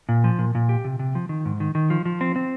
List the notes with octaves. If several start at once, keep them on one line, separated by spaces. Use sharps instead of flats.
A#2
F3
A#2
A#2
G4
C3
C3
F3
D#3
G#2
D#3
D#3
F3
F3
C4
C4